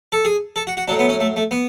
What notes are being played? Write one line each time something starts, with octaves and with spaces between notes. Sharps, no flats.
A4
G#4
A4
F#4
F#4
A2 F#3 D4
B3
C#4
A3
A3
B3